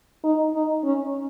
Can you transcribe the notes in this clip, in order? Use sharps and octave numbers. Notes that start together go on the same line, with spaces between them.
D#4
D#4
C#4